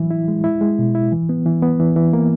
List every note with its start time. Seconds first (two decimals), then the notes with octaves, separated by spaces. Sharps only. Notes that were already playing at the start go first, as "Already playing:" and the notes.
Already playing: E3 F#3 E4
0.10 E4
0.28 G#3
0.44 E4
0.61 G#3
0.79 B2
0.95 E4
1.12 E3
1.29 B3
1.46 E3
1.62 B3
1.80 E3
1.96 E3
2.13 A#3